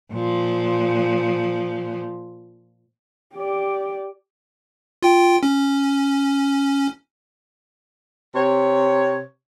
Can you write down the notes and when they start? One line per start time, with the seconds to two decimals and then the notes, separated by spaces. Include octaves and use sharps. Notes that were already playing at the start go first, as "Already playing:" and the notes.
0.12 A#2 F3
3.34 G4 D5
5.03 F4 G5
5.43 C#4
8.35 C3 C#5